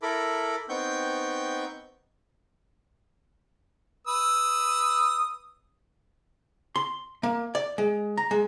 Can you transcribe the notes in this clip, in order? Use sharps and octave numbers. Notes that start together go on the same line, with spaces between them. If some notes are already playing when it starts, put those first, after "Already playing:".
E4 A4 A#4 B5 D6
B3 C4 D#4 G5 C#6 G6
B4 D#6 E6
C6
A#3
D5
G#3
A#5
G#3